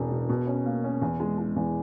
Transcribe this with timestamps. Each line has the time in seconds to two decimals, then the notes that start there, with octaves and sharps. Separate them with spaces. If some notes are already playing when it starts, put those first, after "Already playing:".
Already playing: E1 E2 B2
0.11 B2
0.29 B2
0.47 C#4
0.66 A#3
0.84 C#4
1.02 E2
1.20 G#3
1.38 G#3
1.56 E2